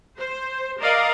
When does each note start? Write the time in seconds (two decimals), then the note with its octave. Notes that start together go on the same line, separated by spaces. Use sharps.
0.18 C5
0.80 A#4 D5 D#5 F5